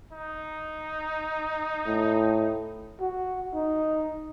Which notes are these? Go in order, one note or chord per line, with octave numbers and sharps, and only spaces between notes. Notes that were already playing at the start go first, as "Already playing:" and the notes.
D#4
A2
F#4
D#4